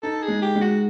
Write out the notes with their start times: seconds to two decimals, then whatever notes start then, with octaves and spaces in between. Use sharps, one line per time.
0.03 D#4 A4
0.22 G#4
0.28 G#3
0.42 G4
0.56 G#3
0.61 F#4